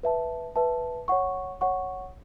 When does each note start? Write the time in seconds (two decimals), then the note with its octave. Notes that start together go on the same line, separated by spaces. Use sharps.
0.03 B4 E5 A5
0.56 B4 E5 A5
1.08 C#5 F#5 C#6
1.61 C#5 F#5 C#6